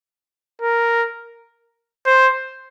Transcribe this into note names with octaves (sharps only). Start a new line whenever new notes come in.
A#4
C5